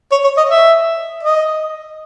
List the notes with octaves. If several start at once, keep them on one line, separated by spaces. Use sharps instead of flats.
C#5
C#5
D#5
E5
D#5